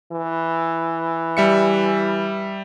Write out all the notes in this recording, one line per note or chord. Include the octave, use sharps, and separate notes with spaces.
E3
G3 E5 C#7